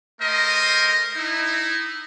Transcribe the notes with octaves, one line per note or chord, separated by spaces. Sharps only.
A3 A#4 C5 D#5
D#4 E4